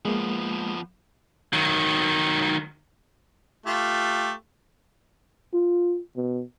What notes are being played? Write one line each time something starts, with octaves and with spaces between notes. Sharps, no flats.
F3 G#3 A#3 B3
D#3 F#3
A3 F4 G4
F4
B2